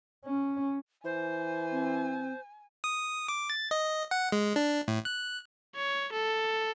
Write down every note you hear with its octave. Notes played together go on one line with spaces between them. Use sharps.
C#4
E3 C5 G#5
C4
D#6
D6
A6
D#5
F#5
G#3
D4
A2
F#6
C#5
A4